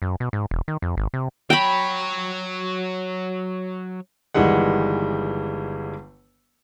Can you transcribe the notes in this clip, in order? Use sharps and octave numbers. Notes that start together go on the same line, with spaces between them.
F#2
B2
G#2
E1
D#3
F2
G#1
C3
F#3 C#5 G5 B5
G1 D#3 E3 G3 G#3 F#5